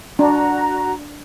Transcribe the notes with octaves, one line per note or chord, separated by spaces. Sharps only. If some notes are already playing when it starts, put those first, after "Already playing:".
D4 F#4 A#5